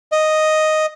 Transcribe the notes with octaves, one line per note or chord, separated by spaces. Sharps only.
D#5